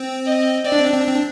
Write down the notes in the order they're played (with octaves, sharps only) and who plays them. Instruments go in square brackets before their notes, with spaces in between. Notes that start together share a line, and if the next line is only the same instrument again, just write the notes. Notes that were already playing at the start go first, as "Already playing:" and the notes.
Already playing: [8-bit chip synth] C4
[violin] D#5
[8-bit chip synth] C4 [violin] D5
[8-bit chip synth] D4
C4
D4
C4
D4
C4
D4